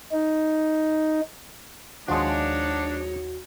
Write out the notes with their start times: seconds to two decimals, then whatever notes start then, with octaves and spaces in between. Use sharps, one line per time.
0.12 D#4
2.08 D#2 F3 G#3 D4 D#4 F#4 C#5